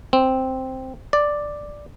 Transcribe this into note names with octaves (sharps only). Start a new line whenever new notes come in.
C4
D5